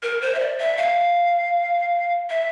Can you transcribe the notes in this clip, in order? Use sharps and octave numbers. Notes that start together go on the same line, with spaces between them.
A#4
C5
E5
D5
E5
F5
E5